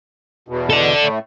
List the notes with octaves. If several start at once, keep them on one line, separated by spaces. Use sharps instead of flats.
E2 B2
A4 D5
A2 A3